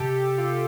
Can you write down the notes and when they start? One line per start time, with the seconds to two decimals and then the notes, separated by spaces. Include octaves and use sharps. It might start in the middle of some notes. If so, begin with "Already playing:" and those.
Already playing: C3 G4 A4
0.38 F4